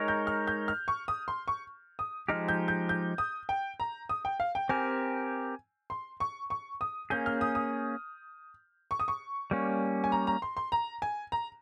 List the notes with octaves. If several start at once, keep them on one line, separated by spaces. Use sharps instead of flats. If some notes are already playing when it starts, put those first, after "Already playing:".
Already playing: G#3 D#4 A#4 C#5
G6
F6
G6
F6
C#6
D#6
C6
C#6
D#6
F3 G#3 D#4 G4 F6
G6
G6
G6
D#6
G5
A#5
D#6
G5
F5
G5
C4 G4 A#4 G#5
C6
C#6
C#6
D#6
A#3 C#4 G#4 G6
F6
D#6
D#6
C#6
D#6
C#6
G3 A#3 C#4
G#5
A#5
A#5
C6
C6
A#5
G#5
A#5